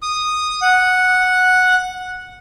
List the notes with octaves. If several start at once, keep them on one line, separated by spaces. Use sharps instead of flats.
D#6
F#5